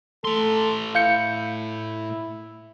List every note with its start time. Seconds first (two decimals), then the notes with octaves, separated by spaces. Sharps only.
0.25 A2 A4 C6
0.95 E4 F5 G6 C#7